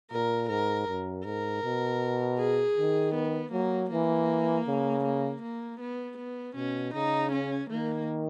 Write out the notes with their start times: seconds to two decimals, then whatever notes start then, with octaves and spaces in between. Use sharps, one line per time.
0.11 A#2 A#4
0.49 G#2 A#4
0.88 F#2
1.25 G#2 A#4
1.63 B2
2.39 G#4
2.77 D#3
3.15 B3
3.52 F#3 A#3
3.91 E3 A#3
4.67 C#3
5.04 A#3
5.42 A#3
5.80 B3
6.18 B3
6.56 B2 C#4
6.94 C#3 D#4
7.32 C#4
7.70 D#3 A#3